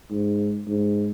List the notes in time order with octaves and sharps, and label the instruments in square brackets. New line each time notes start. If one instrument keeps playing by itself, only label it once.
[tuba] G#2
G#2